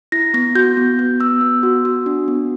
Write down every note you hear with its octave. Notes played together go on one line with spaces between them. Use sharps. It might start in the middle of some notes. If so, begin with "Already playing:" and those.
E4 A#6
B3 A#6
F#4 G6
B3
B3
B3 E6
B3
F#4
F#4
D4
B3